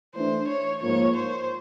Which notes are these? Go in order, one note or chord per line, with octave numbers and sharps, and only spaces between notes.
E3 A3 D4 C5
C#5
G#2 F3 A#3 C#5
C5